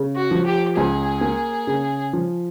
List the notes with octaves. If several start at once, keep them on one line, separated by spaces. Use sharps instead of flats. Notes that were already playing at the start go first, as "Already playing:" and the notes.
Already playing: C#3
F#4
F3
G4
C#2 G#4
A#3
C#3
F3